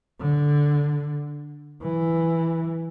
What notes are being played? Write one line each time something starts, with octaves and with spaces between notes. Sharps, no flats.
D3
E3